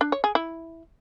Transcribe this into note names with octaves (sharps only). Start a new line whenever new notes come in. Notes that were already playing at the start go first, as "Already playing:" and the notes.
D4
C#5
G#4
E4